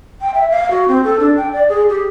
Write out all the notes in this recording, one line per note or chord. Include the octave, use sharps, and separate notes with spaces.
G5
E5
F5
F#4
C4
A4
D4
G5
D5
G#4
G4